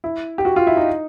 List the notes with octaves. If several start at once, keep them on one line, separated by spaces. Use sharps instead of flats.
E4
G4
F#4
F4
E4
D#4